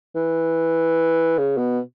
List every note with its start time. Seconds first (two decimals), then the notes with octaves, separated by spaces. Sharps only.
0.15 E3
1.38 C#3
1.58 B2